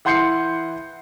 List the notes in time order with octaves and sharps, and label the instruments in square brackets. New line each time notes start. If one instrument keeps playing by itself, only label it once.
[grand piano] E3 F#5 C6 G6 C7 C#7